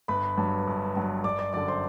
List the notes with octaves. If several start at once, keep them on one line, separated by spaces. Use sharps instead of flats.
G1 B4 B5
G2 F#3
G1
G2 F#3
G1 D5 D6
D5 D6
F#2 D3 D5 D6
C5 C6